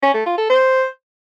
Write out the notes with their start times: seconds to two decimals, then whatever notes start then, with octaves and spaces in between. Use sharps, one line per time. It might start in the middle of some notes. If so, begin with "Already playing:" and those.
0.02 C#4
0.14 A3
0.26 F4
0.38 A4
0.49 C5